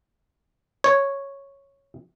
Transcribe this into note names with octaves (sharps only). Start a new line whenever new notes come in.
C#5